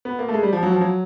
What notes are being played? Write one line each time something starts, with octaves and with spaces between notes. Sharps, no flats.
B3
A#3
A3
G#3
G3
F3
F#3
F3
F#3